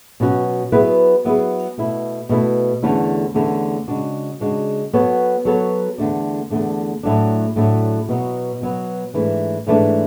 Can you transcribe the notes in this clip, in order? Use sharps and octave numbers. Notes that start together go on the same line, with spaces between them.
B2 F#3 C#4 F#4
F#3 B3 E4 G#4 B4
F#3 B3 E4 G#4 B4
B2 A3 E4
B2 A3 E4
E2 D3 A3 C#4 E4
E2 D3 A3 C#4 E4
C#3 G#3 D4 F#4
C#3 G#3 D4 F#4
F#3 B3 F#4 A4 C#5
F#3 B3 F#4 A4 C#5
E2 D3 A3 D4
E2 D3 A3 D4
A2 F#3 A3 D4
A2 F#3 A3 D4
B2 F#3 B3
B2 F#3 B3
G#2 E3 A3 D4
G#2 E3 A3 D4